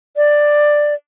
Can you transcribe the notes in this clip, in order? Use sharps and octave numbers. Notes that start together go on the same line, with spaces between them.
D5